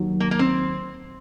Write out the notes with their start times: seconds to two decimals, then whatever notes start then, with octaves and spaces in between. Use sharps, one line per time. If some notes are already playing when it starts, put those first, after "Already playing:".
Already playing: D#2 D#3 F#3
0.20 A#3
0.31 A#3
0.39 C4